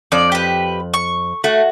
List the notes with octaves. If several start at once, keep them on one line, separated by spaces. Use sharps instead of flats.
F2 D5
G4 B4
C#6
A3 F#4